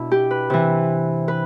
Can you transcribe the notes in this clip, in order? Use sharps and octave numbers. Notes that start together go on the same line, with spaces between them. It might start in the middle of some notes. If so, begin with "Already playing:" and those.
Already playing: B2 D4 E4
G4
B4
C3 E3
B4